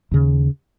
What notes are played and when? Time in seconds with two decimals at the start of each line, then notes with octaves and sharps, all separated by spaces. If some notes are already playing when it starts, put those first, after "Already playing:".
0.11 D#2 C#3